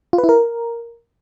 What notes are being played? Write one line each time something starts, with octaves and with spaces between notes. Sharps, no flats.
F4
B4
E4
A#4